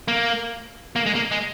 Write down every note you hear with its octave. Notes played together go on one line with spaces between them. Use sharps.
A#3
A#3
G#3
A#3
G#3